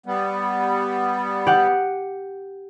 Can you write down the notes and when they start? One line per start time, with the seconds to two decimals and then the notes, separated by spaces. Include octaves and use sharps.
0.06 G3 B3
1.47 G4 F#5